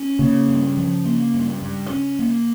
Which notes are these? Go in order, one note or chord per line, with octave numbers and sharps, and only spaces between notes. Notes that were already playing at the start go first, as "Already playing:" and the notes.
Already playing: C#4
C#3 A#3
G2
F3
A#3
G2
G2
C#4
A#3